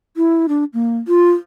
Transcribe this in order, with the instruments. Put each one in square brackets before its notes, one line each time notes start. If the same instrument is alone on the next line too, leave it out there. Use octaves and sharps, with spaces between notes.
[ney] E4
D4
A#3
F4